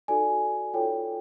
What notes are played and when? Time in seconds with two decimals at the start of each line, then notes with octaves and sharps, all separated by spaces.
0.08 D#4 F#4 A4 D5 G#5
0.74 F4 A4 C#5 G5